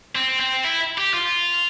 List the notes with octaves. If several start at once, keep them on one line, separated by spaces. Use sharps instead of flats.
C4
C4
E4
G4
F4